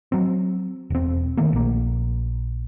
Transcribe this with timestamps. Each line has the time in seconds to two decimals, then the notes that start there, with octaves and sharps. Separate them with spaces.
0.12 F#3 C4
0.90 E1 C4
1.37 D#3 A3 A#3
1.53 A#1 A#3